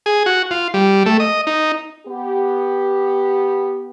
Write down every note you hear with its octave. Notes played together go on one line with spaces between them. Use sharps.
G#4
F#4
F4
G3
A3
D#5
D#4
B3 G4